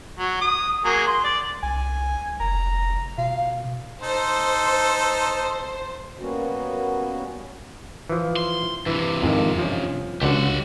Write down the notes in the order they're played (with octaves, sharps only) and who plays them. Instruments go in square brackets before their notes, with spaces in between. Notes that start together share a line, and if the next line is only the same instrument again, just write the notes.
[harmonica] F#3
D#6
F#3 A#3 G#4
C6
D5
[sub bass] C2 [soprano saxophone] G#5
[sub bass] F1 [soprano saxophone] A#5
[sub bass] B2 [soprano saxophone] F5
[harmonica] D#4 A4 [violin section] C5
[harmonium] G3 A#3 B3 C#4 F#4
[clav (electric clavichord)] E3 F3
[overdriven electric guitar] C6
[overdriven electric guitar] G2 C3 [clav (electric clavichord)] E3 E4
[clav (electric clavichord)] F2 G#2 D#3
F3 C#4
[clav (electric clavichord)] C#2 D3 F#3 [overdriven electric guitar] G4 F#5